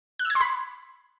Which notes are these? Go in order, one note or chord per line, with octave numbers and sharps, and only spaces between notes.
F#6
E6
G#6
C6
B5